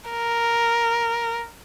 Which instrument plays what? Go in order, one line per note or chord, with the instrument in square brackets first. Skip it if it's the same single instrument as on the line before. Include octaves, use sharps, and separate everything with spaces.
[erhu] A#4